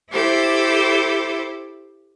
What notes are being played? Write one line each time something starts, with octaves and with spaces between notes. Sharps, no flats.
E4 G4 A4 C5